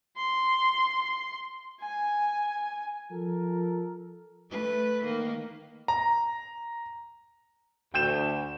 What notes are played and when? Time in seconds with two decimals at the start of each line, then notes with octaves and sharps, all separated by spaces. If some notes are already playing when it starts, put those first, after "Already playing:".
0.17 C6
1.81 G#5
3.10 F3 F4 A4 A#4
4.50 A3 B4
5.04 D#3 A#3
5.88 A#5
7.94 D2 G5 G6 E7